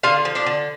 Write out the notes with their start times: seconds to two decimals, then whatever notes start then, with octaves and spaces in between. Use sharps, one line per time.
0.03 D3 F4 F5
0.25 F3
0.35 D4 D5
0.46 D3